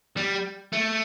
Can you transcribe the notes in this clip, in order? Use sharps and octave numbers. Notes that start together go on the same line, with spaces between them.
G3
A3